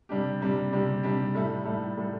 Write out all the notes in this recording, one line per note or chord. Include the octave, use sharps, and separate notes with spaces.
C3 G3 D4 G4
C3 G3 D4 G4
C3 G3 D4 G4
C3 G3 D4 G4
A2 G3 E4 A4
A2 G3 E4 A4
A2 G3 E4 A4